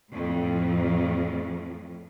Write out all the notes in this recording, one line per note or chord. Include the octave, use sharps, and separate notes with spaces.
F2 A2